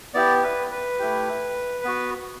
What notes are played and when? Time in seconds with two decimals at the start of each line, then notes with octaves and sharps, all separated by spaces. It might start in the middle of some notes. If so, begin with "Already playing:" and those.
0.14 B3 E4 G4 D5
0.43 B4
0.71 B4
0.99 A3 E4 G4
1.84 B3 F#4